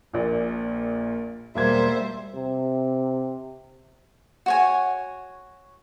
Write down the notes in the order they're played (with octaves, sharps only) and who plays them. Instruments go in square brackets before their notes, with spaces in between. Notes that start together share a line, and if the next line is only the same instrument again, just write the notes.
[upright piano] A#1 A#2
[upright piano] E1 A#3 G#6 [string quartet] G3 C5 E5
[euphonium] C3
[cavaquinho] F#4 C#5 G#5